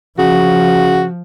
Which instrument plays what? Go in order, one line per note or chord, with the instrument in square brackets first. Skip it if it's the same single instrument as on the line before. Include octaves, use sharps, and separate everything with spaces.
[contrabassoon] C#3 [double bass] F3 [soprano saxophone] F#4